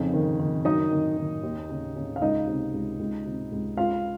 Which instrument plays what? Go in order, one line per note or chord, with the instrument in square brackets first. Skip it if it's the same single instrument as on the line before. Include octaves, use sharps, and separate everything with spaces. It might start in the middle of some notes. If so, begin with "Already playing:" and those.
Already playing: [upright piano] F2 C#3 D#4
D#3
D#3
F#2 D#4 D#5
D#3
D#3
D#2
C#3
C#3
F5
C#2 D#4 D#5
C3
C#2
C#2
C3
C#2
C#2 F4 F5